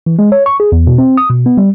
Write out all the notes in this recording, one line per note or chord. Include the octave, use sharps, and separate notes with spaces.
E3
G#3
C#5
C#6
G#4
E2
B2
C4
D#6
B2
B3
G3